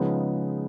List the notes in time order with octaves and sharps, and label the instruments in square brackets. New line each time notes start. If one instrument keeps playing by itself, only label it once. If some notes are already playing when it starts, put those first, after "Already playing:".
Already playing: [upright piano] C#3 F3 G#3 B3 D#4